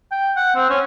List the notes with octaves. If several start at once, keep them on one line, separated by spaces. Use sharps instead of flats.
G5
F#5
C4
C#4